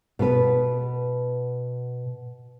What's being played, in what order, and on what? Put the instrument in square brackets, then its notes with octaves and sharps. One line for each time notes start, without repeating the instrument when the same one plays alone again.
[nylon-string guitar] B2 B3 B4